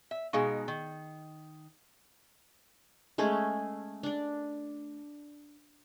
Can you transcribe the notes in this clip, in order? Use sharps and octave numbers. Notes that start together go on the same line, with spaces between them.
E5
B2 G#3 D#4 G#4 F5 C#6
D#3
G#3 A3 C#4 G#4
D4 D5